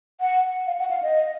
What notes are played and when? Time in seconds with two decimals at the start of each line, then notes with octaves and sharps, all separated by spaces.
0.21 F#5
0.67 F5
0.80 F#5
0.91 F5
1.03 D#5